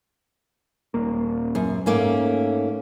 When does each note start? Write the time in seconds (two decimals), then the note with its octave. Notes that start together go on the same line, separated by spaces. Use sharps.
0.94 D#1 A#3
1.55 F#2
1.86 G#2 A3 A#3 C#4